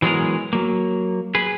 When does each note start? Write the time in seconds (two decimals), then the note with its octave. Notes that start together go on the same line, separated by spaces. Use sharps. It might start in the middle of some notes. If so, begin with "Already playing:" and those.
0.02 E3 F#3 G#3 B3 G#4 A#4
0.53 F#3 A#3
1.35 G#4 B4